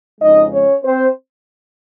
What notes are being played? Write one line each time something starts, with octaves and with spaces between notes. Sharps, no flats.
F2 C#3 F3 G#3 D#4 D#5
C#4 C#5
C4 C5